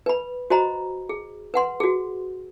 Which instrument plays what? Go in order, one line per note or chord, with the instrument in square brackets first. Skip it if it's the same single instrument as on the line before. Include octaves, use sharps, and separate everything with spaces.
[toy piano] B4 B5
F#4 C5 D#5 A#5 B5
G#4
B4 F#5 C6
F#4 G#4